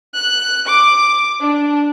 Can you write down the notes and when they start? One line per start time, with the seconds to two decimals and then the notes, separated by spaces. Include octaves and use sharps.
0.14 F#6
0.67 D6
1.40 D4